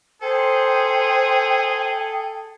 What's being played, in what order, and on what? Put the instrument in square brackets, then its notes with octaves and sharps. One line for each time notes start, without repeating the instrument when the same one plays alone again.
[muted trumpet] G#4 [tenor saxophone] A4 [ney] C5 [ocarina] G5